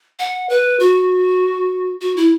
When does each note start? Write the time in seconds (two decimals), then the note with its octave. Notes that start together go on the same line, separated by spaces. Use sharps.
0.19 F#5
0.50 B4
0.80 F#4
2.01 F#4
2.16 E4